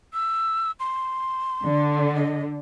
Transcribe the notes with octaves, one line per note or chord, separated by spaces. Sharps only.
E6
C6
D3
D#5